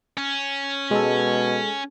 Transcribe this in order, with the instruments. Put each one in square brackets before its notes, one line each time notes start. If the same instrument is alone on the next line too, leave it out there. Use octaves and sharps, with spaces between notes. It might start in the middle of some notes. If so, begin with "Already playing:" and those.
[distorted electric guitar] C#4
[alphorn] B2 [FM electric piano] G#3 A4